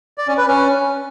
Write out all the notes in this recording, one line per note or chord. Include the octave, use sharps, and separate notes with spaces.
D5
C#4
B4
C#4